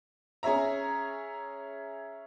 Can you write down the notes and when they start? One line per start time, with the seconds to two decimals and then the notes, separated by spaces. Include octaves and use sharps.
0.43 C#4 G#4 C#5 E5 A#5